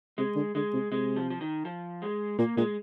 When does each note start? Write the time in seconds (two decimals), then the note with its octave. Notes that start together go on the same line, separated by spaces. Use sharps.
0.18 C3 G#3
0.36 D3
0.55 D3 G#3
0.73 C3
0.91 C3 G#3
1.16 F3
1.30 F3
1.41 D#3
1.65 F3
2.02 G#3
2.39 A#2 A#3
2.57 A#2 G#3